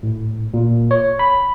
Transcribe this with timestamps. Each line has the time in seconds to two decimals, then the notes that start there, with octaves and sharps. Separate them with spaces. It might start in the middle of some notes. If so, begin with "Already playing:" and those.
0.03 A2
0.54 A#2
0.91 C#5
1.19 B5